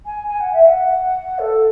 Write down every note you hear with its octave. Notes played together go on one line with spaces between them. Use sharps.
G#5
G#5
F#5
E5
F#5
A4